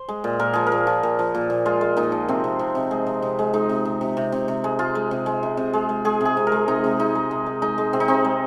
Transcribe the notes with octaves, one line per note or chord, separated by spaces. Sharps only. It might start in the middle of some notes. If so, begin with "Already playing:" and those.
Already playing: C5
G#3
A#2
A#2 A#4
F3 G#4
A#4
A#2
F3
A#2
F3
A#2
A#2
G#3 F4
G#3
A#2 D#4
F3
C3 C4
C3
C3
C3
G#3
C3
C3
G#3
G#3 D#4
C3
C3
C3
C3
C3
C3
G#3
G#3 F4
G#3
C3
G#3
C3
C3
G#3
G#3
G#3 G#4
C3 G#4
C3
A#4
G#3
C3 D#4
C3
C3 D#4
G#3
C3
G#3
G#3 D#4
G#3
C3 C4
D#4
C3 C4
G#3